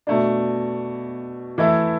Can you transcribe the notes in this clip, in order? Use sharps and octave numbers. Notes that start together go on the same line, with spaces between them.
B2 A3 D4
E3 A3 E4